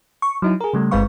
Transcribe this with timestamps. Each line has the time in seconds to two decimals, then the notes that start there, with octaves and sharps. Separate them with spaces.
0.22 C#6
0.42 F#3 D#4 E4
0.61 G#4 A#4
0.73 C#3 G3 A3
0.91 G1 G#3 C4 B4 F5 C#6